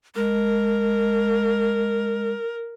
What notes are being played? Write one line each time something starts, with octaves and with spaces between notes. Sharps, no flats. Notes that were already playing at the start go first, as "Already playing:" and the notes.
G#3 A#4